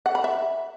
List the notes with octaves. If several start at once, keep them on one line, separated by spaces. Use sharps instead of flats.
F#5
B5
E5